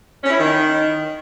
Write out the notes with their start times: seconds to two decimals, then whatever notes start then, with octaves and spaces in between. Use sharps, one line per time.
0.22 C#4
0.30 E4
0.37 D#3